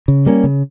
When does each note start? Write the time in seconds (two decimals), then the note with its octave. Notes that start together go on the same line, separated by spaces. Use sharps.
0.08 C#3
0.26 G3 A#3 C#4
0.44 C#3